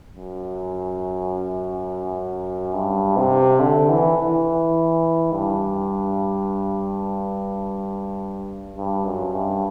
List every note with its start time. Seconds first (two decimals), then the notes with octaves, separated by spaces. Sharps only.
0.16 F#2
2.74 G2
3.17 C3
3.60 D3
3.89 E3
4.17 E3
5.33 G2
8.77 G2
9.05 F#2
9.34 G2